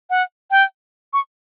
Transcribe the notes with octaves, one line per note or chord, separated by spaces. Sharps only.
F#5
G5
C#6